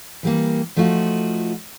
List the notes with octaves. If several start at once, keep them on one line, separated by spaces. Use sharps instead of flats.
E3 G3 A#3
F3 A3 D#4 F4 F#4